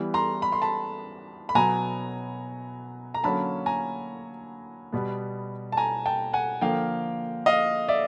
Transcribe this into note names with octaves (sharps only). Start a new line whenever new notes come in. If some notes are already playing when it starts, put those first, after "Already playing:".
Already playing: E3 G3 B3
A#5 C6
B5
C6
A5 B5
B5
B2 F#3 B3 G#5 A#5
A#5
D3 F#3 A#3 C#4 A5 B5
G#5 A#5
B2 G3 B3
A5
G#5 A#5
G5 A5
F#5 G#5
D3 F3 A#3 F5 G5
D#5 F5
D5 E5